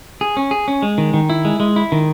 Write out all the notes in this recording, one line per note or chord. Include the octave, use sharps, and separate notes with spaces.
G#4
C#4
G#4
C#4
G#3
D#3
D#3
E4
G#3
G#3
E4
D#3